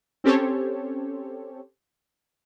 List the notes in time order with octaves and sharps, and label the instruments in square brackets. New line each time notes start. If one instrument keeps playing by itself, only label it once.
[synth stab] C4 C#4 G4 A4 C5 C#5